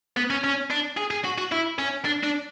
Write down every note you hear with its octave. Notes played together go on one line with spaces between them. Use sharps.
B3
C#4
C#4
D4
G#4
G#4
F#4
F#4
E4
C#4
D4
D4